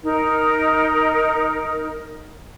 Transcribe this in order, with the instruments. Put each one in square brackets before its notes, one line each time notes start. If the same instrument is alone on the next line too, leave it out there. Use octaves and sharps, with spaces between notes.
[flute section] D#4 A#4